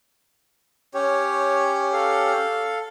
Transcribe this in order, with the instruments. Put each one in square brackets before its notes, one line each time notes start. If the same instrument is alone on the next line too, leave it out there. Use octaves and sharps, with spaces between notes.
[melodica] C#4 G4 [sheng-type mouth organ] C#5
[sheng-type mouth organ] A4 F5